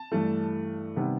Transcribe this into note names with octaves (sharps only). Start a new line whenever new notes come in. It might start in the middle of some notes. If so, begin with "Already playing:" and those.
Already playing: A5
G2 E3 A3
C3 D#3 G3 B3